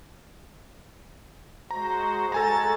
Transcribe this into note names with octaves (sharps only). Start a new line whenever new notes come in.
G#3 F#4 C5 A#5
G#3 F#4 A4 G#5 A#5 A6